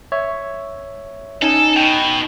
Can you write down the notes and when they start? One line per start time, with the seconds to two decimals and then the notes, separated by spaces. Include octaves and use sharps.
0.12 C#5 E5
1.42 C#4 D#4 A4 G#5
1.76 B2 G5